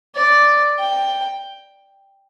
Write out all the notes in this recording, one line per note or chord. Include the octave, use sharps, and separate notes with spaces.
D5
G5